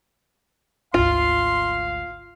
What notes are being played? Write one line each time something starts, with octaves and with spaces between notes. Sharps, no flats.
G#1 D2 F4 F5 C6